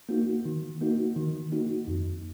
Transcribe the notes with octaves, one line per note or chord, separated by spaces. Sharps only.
A#3 D#4 F#4
D#3
A#3 D#4 F#4
D#3
A#3 D#4 F#4
F2